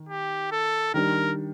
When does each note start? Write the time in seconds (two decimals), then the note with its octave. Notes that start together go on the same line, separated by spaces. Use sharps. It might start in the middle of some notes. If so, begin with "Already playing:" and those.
Already playing: D#3
0.09 G4
0.52 A4
0.94 D#3 G3 D4 A#4